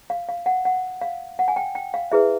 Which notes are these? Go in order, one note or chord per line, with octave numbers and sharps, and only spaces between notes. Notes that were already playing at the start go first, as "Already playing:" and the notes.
F5
F5
F#5
F#5
F5
F#5
G#5
G5
G5
F5
E4 G#4 B4 E5